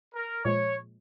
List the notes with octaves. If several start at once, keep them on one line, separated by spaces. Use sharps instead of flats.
A#4
A#2 F3 G#3 C#5